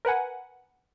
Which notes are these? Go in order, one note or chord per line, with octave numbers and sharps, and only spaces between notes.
A#4 B4 F#5 G#5